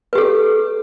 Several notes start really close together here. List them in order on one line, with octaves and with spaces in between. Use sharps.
B4 G4 A4